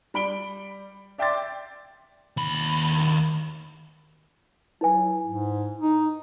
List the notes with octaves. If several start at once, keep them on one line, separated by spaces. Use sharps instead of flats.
G3 B5 D7 G7
D5 E5 G5 C6 D6 A6
D#2 B5
F#3 E4 B4 G#5
G#2
D#4